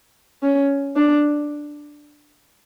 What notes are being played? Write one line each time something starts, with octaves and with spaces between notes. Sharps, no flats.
C#4
D4